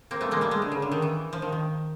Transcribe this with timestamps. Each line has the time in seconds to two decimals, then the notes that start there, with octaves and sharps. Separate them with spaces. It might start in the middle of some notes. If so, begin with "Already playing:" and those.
0.11 A#3 C4
0.21 A3 B3
0.31 G#3 A#3
0.41 G3 A3
0.51 G#3
0.62 D3
0.72 C#3
0.82 D3
0.92 D#3
1.02 E3
1.33 F3
1.42 D#3
1.52 D#3